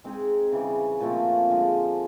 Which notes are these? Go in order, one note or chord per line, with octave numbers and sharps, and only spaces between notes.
G#3 C4 D#4 G#4
C#3 E3 G3
A#2 F3 A3 C4
D3 F3 G#3